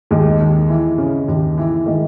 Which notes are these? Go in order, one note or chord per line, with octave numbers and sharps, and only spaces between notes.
D#2 G#3
D#2
E3
C#3
D#2
E3
D#3 G#3